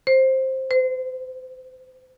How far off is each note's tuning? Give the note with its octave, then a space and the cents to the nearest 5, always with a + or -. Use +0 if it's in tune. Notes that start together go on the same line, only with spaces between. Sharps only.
C5 +10
C5 -35